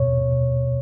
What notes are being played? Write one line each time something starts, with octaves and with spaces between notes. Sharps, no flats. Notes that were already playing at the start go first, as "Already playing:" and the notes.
Already playing: B2 C#5
B2